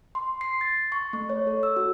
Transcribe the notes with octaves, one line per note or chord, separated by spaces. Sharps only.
C6
C7
A6
C#6
A3
C#5
A4
E6
F#4